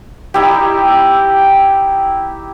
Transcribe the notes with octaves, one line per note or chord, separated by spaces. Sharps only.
D#4 E4 G4